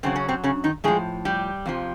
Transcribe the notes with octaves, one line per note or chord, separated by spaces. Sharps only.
F#2 C#3 F#3 C4
C#4
C3 C4
C#3 C#4
D#3 D#4
A2 F3 G#3 G#4
G3 G4
F2 C3 F3